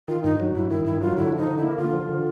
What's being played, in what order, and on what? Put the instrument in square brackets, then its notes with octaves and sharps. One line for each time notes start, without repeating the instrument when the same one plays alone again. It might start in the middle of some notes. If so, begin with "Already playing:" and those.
[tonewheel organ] D#3 [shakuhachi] F4
[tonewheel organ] G2 [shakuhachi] D#4
[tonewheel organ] F#3
[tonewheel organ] G2 [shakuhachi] E4
[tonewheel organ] D#3 [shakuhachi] E4
[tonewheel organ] G2 [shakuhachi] E4
[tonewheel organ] F#3 [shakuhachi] F4
[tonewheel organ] D3 [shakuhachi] E4
[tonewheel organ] F3 [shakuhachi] D#4
[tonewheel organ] D3
[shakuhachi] E4
[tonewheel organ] A#3
[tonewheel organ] D3 [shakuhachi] F4
[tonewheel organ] F3
D3